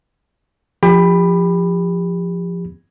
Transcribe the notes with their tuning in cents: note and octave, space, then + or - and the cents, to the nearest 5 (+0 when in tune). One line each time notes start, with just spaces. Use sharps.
F3 +0 G4 +35 B5 +0